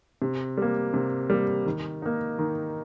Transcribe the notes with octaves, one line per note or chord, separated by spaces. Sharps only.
C3
G3 A#3
C3
G3 A#3
D#3
A#3 D#4
D#3